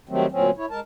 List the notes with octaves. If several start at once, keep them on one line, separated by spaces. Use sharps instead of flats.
D#3 F#3 G3 A3 C4
D2 A#2 F#3 C4 C#4
E4 C#5
G#3 A#4 A5